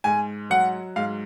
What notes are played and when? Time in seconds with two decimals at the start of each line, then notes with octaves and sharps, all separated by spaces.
0.04 G#2 G#5
0.50 F#3 F#5
0.96 G#2 F5